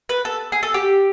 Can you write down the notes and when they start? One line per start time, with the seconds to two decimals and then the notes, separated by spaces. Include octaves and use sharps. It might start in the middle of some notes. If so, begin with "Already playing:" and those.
0.09 B4
0.25 A4
0.52 G#4
0.63 A4
0.74 G4